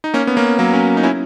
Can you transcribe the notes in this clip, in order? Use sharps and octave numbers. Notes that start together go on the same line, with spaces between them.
D#4
A#3 C#4
B3
A#3 C#4
F#3 A#3
A#3 C#4
D#4
C#4 E4